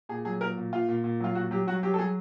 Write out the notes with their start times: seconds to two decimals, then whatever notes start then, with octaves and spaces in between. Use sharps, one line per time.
0.09 A#2 G#4
0.25 F#3 G#4
0.41 A#2 A#4
0.57 A#2
0.73 A#2 F4
0.88 A#2
1.04 A#2
1.20 F#3 F4
1.35 A#2 F#4
1.51 F#3 G4
1.67 F#3 F#4
1.83 F#3 G4
1.94 A4
1.98 F#3 G#4